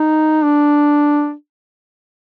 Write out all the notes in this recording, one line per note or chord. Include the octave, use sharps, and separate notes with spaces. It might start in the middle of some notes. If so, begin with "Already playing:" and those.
Already playing: D#4
D4